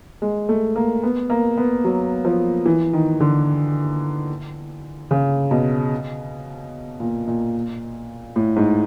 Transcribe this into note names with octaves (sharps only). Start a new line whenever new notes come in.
G#3
A3
A#3
B3
A#3
B3
F#3
F3
E3
D#3
D3
C#3
B2
A#2
A#2
A2
G#2